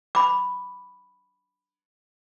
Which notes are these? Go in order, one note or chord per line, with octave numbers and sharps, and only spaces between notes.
B5 D6